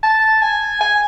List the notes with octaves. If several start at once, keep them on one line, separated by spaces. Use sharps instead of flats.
A5
G#5
G#5